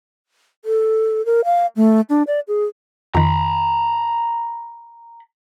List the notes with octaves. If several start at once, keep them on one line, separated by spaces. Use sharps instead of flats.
A4
A#4
F5
A3
D4
D5
G#4
F2 D#3 A#5 B5